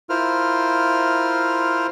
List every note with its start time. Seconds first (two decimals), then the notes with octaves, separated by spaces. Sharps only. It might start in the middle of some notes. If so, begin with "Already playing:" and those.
0.10 E4 F4 A#4 C5 F6